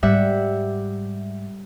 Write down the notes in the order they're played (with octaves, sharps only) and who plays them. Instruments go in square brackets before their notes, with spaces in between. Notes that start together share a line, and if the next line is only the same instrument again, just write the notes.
[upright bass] G#2 [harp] G3 E5 F#5